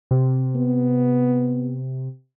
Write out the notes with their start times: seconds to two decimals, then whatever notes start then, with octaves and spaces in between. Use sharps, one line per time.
0.11 C3
0.55 B3